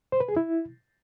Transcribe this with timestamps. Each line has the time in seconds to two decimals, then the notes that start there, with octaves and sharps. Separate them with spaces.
0.12 C5
0.20 B4
0.28 G#4
0.37 E4